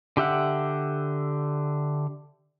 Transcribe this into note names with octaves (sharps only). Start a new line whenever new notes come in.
D3 G4 E5 F#5